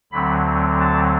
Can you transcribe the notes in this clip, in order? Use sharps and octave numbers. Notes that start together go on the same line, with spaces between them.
D2 D3 F#3 C4 B5
A5